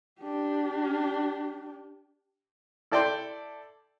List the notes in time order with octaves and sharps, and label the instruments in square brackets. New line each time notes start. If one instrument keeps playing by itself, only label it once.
[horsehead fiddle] D4 G4
[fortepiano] E4 A4 D5 G5 C6